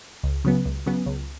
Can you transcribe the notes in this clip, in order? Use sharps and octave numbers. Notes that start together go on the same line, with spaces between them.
C#2
C#3 F#3 B3
C#2
C#3 F#3 B3
C#2